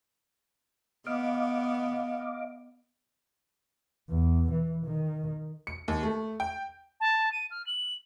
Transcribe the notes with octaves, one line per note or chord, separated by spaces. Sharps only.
B3 D#5 F5 D6
E2
E3
D#3
C#7
D#2
A3
G5
A5
D#7
F6
F#7